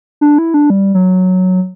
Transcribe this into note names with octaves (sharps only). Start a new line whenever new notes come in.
D4
E4
D4
G3
F#3